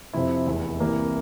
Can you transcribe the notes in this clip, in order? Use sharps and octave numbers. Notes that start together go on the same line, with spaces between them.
F2 C3 F3 C4 E4
F1 E2 E3
C2 C3 E3 A#3